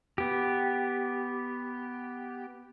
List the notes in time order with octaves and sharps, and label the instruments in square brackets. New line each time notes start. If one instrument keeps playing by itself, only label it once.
[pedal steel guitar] B3 G4